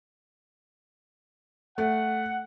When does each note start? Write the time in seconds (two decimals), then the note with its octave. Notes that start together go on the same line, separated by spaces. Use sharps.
1.78 A3 F#5